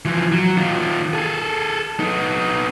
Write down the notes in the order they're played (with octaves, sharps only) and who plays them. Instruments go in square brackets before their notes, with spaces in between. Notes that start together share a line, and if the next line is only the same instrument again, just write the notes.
[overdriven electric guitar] E3 F3
F#3
D#3 F4
G#4 A4
B3 D#4